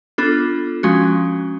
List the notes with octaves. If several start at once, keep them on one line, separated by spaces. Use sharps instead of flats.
B3 D4 F4 A4
F3 G#3 C#4 F#4